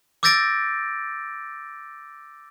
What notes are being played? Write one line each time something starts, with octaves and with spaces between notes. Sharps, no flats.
D6 E6 G6 A6 A#6 D7